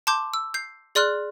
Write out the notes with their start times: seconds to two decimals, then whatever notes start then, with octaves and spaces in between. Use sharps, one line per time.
0.07 A5 C6 D6 G6
0.34 E6
0.54 G6 C7
0.95 G#4 D5 C6 F6 F#6